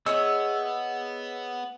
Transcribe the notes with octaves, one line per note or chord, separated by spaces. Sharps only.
B3 G#4 C#5 D#5 E5 E6